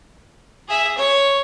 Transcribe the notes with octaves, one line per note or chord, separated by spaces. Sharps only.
G#4 E5
C#5